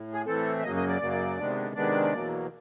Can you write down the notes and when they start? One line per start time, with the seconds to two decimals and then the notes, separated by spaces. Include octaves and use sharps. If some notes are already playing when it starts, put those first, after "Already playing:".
Already playing: A2
0.13 G#4
0.26 A2 E3 A3 C4 A4
0.58 E5
0.63 F#2 C#3 F#3 A#3 D#5
0.76 D#5
0.88 D5
1.01 F#2 C#3 F#3 A#3
1.39 C3 D#3 G#3 B3 D4
1.76 C3 D#3 G#3 B3 D4 D5
2.13 E2 B2 F#3 A#3